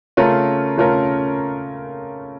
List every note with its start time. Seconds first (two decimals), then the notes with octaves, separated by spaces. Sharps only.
0.17 C#3 A3 C#4 F4 A#4
0.77 C#3 A3 C#4 F4 A#4